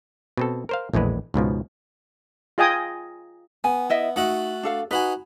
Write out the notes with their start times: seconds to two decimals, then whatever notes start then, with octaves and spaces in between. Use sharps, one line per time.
0.37 B2 C4 A4
0.69 A#4 C5 F5
0.94 A#1 E2 A2 G#3 B4
1.34 C#2 G#2 B2 F3
2.58 F4 G#4 D#5 G5 G#5 D#6
3.64 B3 G#5
3.90 E4 D#5 E5
4.16 A3 D#4 F#4 E5
4.63 D4 A4 F5
4.91 D#4 F#4 B4 G#5